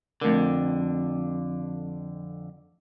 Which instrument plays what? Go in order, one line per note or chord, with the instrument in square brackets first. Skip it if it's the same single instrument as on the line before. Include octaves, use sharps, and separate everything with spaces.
[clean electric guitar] F2 D3 [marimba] A3 A#4